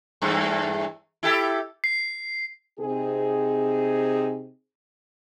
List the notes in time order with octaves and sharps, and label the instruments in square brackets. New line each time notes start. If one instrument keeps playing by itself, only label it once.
[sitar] E2 G2 A3
E4 G4 A4
[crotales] C7
[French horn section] C3 C4 D#4 G#4